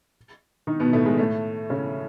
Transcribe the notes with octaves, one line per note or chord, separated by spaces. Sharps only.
D#3 D#4
B2 B3
A2 A3
G#3
A2 A3
C#3 C#4